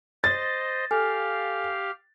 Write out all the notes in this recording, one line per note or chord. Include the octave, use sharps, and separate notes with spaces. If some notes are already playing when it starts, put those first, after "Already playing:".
C5 D#5 A6
G4 A4 F5 G#5 F6